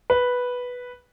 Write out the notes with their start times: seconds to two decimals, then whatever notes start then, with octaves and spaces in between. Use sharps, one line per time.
0.10 B4